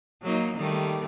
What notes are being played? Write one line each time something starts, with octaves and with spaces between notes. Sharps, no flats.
F#3 A#3 D#4
D#3 G3 A3